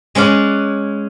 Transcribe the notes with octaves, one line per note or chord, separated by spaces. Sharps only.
G#3 C#4 D5 F#5